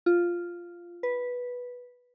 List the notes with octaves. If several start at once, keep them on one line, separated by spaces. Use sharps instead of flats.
F4
B4